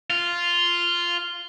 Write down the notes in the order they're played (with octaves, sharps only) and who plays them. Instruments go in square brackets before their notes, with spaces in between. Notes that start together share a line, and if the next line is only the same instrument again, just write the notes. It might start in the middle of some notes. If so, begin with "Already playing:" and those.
[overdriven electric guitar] F4